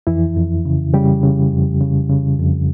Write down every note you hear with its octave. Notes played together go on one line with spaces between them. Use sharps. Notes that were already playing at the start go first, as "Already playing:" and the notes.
F2 E3 E4
F2
C#3
C#3 G3 G4
C#3
F2
C#3
C#3
F2